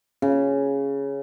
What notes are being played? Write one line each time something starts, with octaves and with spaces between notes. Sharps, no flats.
C#3